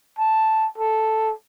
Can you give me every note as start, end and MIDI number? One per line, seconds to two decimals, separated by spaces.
0.19 0.67 81
0.78 1.33 69